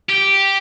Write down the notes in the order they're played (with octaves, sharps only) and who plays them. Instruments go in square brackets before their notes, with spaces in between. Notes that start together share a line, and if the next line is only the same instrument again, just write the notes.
[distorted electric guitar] G4